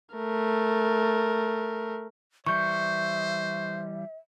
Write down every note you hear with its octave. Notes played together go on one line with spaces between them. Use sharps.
A3 A#4
E3 G3 C5 E5 C#6 G6